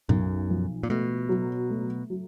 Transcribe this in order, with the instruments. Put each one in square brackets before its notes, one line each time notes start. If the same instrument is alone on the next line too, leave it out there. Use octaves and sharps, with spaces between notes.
[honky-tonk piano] B1 [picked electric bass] F#2
[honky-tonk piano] F3
[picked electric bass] A#2
[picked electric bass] B2 [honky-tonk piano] A3
[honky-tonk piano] F#3
A3
F#3